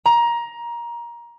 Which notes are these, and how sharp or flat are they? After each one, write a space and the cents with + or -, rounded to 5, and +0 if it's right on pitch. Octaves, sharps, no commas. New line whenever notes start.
A#5 +20